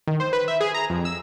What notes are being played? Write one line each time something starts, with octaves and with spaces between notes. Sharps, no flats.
D#3
C5
B4
E5
G#4
A#5
F2
E6